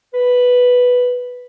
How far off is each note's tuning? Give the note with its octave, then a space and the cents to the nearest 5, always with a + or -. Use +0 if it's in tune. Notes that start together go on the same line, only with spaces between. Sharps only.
B4 +0